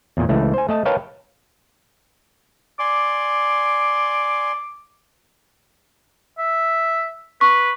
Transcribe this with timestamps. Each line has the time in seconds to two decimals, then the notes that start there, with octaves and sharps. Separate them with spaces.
0.17 E2 A#2
0.29 C#2 E3 A3
0.54 C5 G#5
0.69 A3 D#5 A5
0.85 A#4 B4 C#5 F5 G5 A5
2.79 D5 G#5 C6 D6
6.38 E5
7.41 B4 C#6